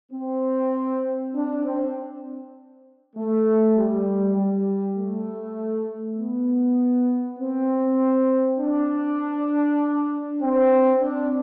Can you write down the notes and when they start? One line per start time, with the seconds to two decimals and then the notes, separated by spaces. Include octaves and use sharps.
0.12 C4
1.34 D4
1.64 C4
3.15 A3
3.76 G3
4.35 G3
4.96 A3
6.17 B3
7.39 C4
8.59 D4
10.41 C4
11.01 D4